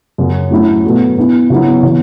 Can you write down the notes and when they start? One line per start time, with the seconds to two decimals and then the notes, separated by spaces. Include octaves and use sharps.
0.18 F#2 C#3 F#3
0.51 A2 F#3 C#4 E4
0.85 B2 F#3 A3
1.17 B2 B3 E4
1.50 C#3 F#3 B3 E4
1.83 C#3 E3 B3